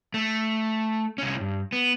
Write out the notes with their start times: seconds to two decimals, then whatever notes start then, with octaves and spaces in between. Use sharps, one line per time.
0.14 A3
1.18 C2 C#4
1.40 G2
1.73 B3